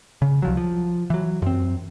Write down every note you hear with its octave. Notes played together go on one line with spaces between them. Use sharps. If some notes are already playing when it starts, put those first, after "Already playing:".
C#3
C2 F3 F#3
F3
E3 F#3
F#2 C4